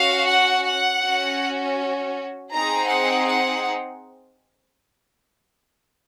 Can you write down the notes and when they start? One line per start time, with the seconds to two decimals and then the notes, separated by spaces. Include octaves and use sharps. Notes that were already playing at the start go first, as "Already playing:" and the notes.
Already playing: C#4 F#4 F5
0.28 F#5
0.65 F#5
1.03 C#4 F#4
2.52 C4 D#4 G#4 A#5
2.89 F#5
3.27 F#5